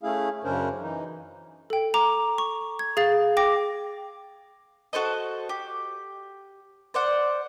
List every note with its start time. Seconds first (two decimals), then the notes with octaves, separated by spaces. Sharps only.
0.03 A3 C#4 E4 G#4 F5
0.44 F#2 C#3 C#4 D4 A#4 C5
0.81 E3 D#4
1.70 A4 G5
1.94 A#5 D6
2.38 C#6
2.79 G#6
2.97 G#4 F5 A6
3.37 G5 D6 A#6
4.93 F#4 A4 C5 D#5
5.49 G4
6.94 C5 D5 F#5